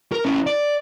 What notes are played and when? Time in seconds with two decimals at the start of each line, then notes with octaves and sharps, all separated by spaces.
0.12 A#4
0.25 C#4 E4
0.47 D5